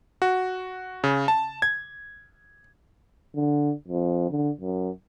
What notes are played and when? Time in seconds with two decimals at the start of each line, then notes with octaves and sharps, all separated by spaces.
0.22 F#4
1.04 C#3
1.28 A5
1.62 G#6
3.35 D3
3.88 F2
4.30 D3
4.61 F#2